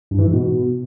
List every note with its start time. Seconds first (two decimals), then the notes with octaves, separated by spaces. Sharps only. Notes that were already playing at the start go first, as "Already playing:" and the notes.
0.11 G2
0.19 E3
0.26 G#2
0.34 B2